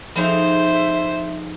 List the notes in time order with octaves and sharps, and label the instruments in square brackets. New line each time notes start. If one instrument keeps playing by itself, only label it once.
[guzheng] F2 D#4 G#4 [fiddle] C5 [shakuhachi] E5